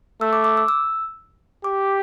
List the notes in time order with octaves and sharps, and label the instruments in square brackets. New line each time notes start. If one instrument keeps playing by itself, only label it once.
[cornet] A3 [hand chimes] E6
[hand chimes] D6
D6
E6
E6
[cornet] G4 [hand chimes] D6